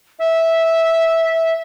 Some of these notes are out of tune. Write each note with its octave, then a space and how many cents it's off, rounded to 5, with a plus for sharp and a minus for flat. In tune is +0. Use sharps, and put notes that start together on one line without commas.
E5 -10